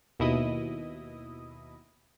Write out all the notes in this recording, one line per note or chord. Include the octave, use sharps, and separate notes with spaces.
D#2 B2 E4 D#5 D#6